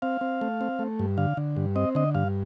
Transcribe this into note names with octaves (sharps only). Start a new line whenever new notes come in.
C4 F5
C4
A3
C4
A3
G2
D3 F5
D3
G2
C4 D#5
D3 D#5
G2 F5